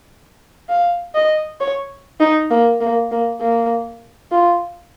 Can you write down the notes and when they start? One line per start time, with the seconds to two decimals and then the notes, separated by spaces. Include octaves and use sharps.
0.69 F5
1.14 D#5
1.60 C#5
2.20 D#4
2.51 A#3
2.81 A#3
3.11 A#3
3.41 A#3
4.32 F4